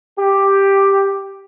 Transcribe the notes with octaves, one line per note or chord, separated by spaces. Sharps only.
G4